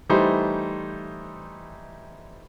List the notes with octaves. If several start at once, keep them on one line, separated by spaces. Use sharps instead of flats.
E3 G3 A3 D#4 C5